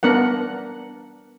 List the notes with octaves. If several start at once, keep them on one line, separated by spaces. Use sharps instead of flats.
B3 D4 A#4 F#5